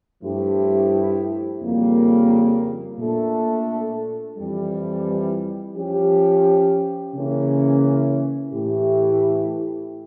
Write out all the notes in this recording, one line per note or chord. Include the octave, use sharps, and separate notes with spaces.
G2 F3 A3 E4 G4
F2 C#3 G3 A#3
A#2 A3 D4 A4
F2 E3 G3
F3 C#4 G4
C#3 E3 A#3 C#4
A2 E3 A3 E4 G4